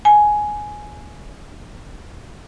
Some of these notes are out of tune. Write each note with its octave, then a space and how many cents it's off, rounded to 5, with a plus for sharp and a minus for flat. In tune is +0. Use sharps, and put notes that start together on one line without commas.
G#5 +10